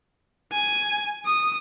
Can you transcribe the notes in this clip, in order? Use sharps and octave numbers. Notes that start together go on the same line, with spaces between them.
G#5
D#6